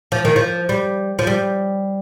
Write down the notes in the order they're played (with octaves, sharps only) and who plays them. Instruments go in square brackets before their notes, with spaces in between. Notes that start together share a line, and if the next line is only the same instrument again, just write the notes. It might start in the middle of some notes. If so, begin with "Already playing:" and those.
[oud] F3
D#3
F3
G3
F3
G3